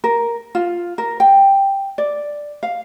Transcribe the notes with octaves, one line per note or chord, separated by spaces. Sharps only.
A#4
F4
A#4
G5
D5
F5